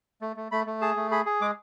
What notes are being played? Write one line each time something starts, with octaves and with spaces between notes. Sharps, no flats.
A3
A3
A3 B5
A3
G#4 A5
A3
G#4 B5
G#4
G#3 D6